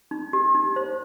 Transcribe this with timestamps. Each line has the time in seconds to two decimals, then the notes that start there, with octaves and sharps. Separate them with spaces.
0.11 D#4
0.33 G4
0.55 D#4
0.76 C5